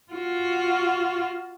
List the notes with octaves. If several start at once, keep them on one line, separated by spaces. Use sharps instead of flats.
F4 F#4